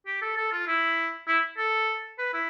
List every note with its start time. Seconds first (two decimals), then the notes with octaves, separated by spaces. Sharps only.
0.06 G4
0.22 A4
0.37 A4
0.52 F4
0.67 E4
1.28 E4
1.58 A4
2.19 B4
2.34 E4